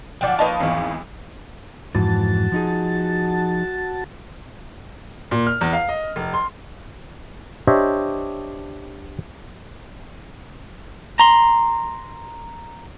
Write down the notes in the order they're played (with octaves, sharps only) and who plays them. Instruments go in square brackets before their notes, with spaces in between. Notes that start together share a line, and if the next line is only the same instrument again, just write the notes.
[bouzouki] D3 F3 F#3 [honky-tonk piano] D5 G5
[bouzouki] F3 A#3 C#5 [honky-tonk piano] B4 D#5 A5
[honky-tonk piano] G#1 E2
[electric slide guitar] F2 G#2 E3 [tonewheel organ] F#4 A5
[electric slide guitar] F3 D#4 G#4
[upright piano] A#2
F6
E2
F5
D#5
F1
C6
[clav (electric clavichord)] D4 G4 C5 C#5 D#5 E5
[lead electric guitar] A#5 C6